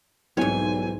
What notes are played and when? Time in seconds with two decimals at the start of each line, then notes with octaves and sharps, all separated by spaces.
0.37 B1 G#2 E3 G3 C4 C#5 G#5